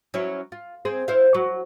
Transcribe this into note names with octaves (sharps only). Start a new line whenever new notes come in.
F#3 C#4 E4
F4
C4 G#4 C5
E4 C5 F5
F#3